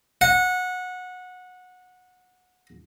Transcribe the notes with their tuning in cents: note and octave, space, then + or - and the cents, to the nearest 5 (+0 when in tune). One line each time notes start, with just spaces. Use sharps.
F#5 -20